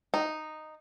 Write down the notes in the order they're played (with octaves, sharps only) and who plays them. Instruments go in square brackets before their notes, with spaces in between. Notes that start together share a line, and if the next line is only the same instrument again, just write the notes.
[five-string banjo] D#4